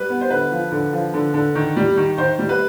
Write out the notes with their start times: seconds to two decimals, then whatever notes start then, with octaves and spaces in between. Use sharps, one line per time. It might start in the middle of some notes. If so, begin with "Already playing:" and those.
Already playing: G3 B4
0.09 B3
0.21 C5
0.30 D3 B4
0.51 F3
0.72 D3
0.93 F3
1.14 D3
1.34 D3
1.55 D#3
1.76 G3
1.97 D#3
2.18 D#3 C5
2.39 G3
2.49 B4